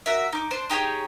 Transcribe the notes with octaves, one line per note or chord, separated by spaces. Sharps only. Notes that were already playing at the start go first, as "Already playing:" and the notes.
F#4 A#4 E5
D#4 D6
D4 C5
D#4 G4 G#4 C#5